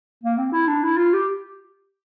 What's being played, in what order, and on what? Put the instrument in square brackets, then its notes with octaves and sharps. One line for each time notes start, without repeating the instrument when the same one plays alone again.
[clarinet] A#3
C4
E4
D4
E4
F4
G4